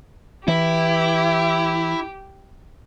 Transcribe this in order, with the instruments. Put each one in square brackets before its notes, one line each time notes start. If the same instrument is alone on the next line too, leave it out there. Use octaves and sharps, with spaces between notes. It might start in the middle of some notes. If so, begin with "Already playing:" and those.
[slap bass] E3 [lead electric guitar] E4 [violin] G4